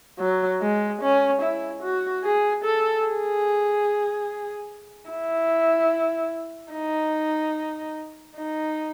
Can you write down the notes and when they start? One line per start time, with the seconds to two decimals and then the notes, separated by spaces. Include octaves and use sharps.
0.19 F#3
0.61 G#3
1.01 C#4
1.42 E4
1.83 F#4
2.24 G#4
2.64 A4
3.06 G#4
5.10 E4
6.73 D#4
8.36 D#4